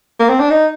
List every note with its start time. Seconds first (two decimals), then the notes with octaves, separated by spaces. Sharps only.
0.20 A#3
0.29 C4
0.40 D4
0.50 D#4